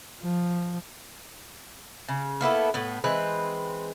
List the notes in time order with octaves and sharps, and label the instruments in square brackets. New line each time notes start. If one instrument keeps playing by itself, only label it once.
[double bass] F3
[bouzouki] C#3
A#3 B3 E4 A4
A2 B3
E3 G#3 C4 B4